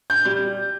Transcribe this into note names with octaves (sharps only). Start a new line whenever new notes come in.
G6
G3